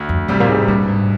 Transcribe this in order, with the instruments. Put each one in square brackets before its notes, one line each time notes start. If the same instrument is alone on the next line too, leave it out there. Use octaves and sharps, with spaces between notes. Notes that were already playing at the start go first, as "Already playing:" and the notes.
Already playing: [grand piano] D2
[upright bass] F2
[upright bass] G2 [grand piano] C3 G3
[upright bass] A#2
G#2
[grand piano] G2 [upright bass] A#2
[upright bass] G#2